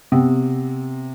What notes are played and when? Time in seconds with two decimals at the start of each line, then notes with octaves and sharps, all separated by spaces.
0.12 C3 B3 C4